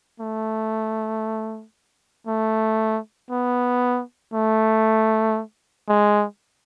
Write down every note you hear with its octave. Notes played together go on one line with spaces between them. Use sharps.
A3
A3
B3
A3
G#3